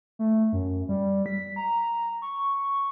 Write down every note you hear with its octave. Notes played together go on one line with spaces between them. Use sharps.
A3
F#2
G3
B6
A#5
C#6